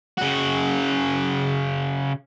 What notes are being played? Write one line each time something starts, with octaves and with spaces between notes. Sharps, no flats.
C#3 F#4